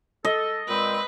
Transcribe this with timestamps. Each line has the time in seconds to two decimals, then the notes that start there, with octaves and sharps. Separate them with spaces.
0.25 A4 D#5
0.68 A#2 G#3 C4 B4